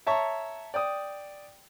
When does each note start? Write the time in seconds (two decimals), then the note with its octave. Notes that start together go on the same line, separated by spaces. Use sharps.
0.06 C#5 E5 A5 A#5 C#6
0.74 D5 G5 D#6